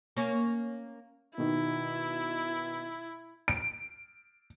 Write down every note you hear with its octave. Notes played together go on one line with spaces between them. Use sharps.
A#3 C#4
B2 D#3 E4
D7